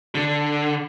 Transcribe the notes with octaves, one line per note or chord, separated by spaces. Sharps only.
D3